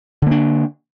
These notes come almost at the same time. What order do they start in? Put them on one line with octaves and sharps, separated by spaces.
D3 A#3 D4